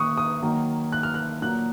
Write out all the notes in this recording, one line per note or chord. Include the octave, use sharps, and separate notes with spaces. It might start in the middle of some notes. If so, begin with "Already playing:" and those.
Already playing: D#3 A#3 C#6 D#6 F#6
D#6
D#3 F#3 A#3
F#6
F6
F#6
A#2 F#3 A#3 F#6